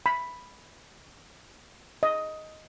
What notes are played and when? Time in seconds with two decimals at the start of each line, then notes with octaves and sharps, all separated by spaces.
0.06 B5
2.03 D#5